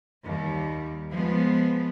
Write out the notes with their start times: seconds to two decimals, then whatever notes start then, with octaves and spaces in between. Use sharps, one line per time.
0.24 D#2 G3
1.12 F3 G#3 B3